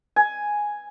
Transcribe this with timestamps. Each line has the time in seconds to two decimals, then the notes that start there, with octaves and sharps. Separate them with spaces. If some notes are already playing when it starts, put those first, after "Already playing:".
0.16 G#5